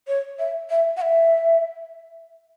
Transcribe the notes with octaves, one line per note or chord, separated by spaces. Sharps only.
C#5
E5
E5
F#5
E5